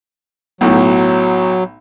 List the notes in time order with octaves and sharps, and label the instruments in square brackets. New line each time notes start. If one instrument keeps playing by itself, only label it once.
[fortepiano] B1 A2 [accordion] F#3